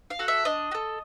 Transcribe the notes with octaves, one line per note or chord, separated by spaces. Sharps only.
F5
F#4 A4
E5
D4 D#5
F#4
A4